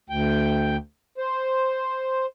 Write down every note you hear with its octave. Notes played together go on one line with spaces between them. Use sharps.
D2 G5
C5